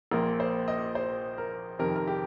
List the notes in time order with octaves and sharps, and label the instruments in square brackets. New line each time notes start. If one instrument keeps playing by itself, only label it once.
[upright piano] A#1 A#2 A#3 A#4
C5
D#5
C5
A#4
F2 C3 D#3 A#4
A#4
G4